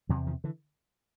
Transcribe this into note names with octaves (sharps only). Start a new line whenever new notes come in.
E2 C3 E3 F#3
D#3 F3
D3 E3